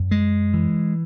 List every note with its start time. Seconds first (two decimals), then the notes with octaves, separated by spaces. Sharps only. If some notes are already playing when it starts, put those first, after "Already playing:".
Already playing: F#2
0.11 G#3
0.54 E3